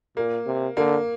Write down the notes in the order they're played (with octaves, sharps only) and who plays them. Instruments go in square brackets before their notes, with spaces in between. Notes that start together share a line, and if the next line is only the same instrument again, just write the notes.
[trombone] A#2 [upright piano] A#3
[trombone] C3
[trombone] D3 [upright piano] A#3